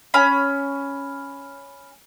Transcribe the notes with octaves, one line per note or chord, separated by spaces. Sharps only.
C#4 B5